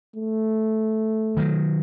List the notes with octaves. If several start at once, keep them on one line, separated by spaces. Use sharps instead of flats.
A3
D#3 F#3